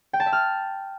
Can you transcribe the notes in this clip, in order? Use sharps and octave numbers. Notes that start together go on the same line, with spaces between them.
G5
A5
E5
F6